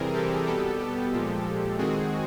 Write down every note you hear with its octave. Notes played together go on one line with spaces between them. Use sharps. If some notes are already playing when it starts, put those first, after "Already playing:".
Already playing: C3 E3 G3 C4 G#4 A#4
G4 A4
B2 G3 B3 G4 A4
G4 A4
A#2 F3 G#3
D#3 G#3 C4 F#4 G#4